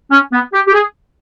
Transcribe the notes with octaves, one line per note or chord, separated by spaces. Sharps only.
C#4
B3
G4
G4
G#4